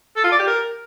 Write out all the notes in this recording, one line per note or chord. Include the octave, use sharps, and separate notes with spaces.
A4
F4
D5
G4
A#4